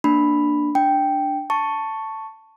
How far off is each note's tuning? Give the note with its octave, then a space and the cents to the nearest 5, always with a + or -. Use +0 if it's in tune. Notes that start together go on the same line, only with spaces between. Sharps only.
A#3 +0 D4 +5 B5 +0
D4 +0 G5 +0
A5 +5 C#6 +0